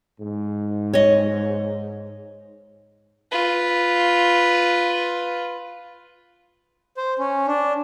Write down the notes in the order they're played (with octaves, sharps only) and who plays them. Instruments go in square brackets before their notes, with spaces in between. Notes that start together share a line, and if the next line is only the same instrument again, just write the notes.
[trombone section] G#2
[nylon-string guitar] C#5 D#5
[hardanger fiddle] F4 B4
[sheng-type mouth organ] C5
C#4
D4